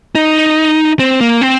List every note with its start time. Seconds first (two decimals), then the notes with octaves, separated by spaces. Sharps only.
0.15 D#4
0.99 C4
1.21 A#3
1.41 C4